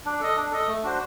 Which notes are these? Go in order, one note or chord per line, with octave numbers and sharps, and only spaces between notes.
D4
A4 D#5
D4
A4 D#5
A3
D4 F#4 C5